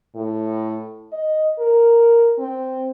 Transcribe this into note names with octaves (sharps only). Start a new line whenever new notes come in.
A2
D#5
A#4
C4